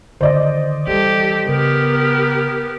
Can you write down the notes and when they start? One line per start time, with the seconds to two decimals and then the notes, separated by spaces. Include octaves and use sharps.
0.21 D3 D#3 C5 D5 D#5
0.87 E3 G3 G4 A4
1.47 C#3 B3 G4 A#4